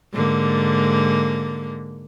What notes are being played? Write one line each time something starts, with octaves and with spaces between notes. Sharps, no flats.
G#2 D3 A#3